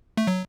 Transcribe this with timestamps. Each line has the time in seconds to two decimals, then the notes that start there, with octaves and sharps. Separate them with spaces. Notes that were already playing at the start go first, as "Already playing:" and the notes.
0.17 A3
0.27 F#3